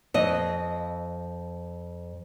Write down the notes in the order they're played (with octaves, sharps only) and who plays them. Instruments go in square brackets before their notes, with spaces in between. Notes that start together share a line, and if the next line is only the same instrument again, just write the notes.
[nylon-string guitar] F2 D#5